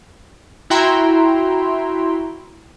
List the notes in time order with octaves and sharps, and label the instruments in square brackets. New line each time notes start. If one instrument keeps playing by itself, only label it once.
[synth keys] E4 F#4 E5 G5 A#5 C6